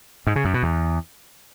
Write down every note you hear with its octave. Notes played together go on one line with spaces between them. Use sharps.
G#2
C#3
F#2
B2
E2